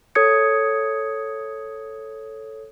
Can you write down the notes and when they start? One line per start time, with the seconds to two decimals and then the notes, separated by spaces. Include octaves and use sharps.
0.15 A4 C#5 D#6 G#6 C#7